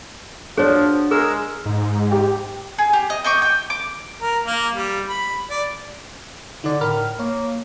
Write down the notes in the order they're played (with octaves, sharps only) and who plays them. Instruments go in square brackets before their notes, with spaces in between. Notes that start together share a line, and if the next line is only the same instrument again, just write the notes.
[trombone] F3 [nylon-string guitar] D4 F#4 [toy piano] G#4 C5 C#5
[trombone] G#3 [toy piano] G#4 [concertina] A#4 E6
[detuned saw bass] G#2
[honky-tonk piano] G4 G5
[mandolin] G#4
G4
D#5
D#5 G5 C#6 D6
G5
D6
[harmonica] A#4
A#3
G3
B5
D5
[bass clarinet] D3 [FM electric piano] D#4 D5
[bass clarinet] A2 [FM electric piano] A#4 B5 F6
[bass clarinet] A#3 [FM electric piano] C#5